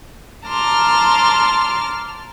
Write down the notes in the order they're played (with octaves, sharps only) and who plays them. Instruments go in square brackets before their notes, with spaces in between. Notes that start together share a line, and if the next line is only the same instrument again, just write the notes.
[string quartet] A5 A#5 C6 D6 F6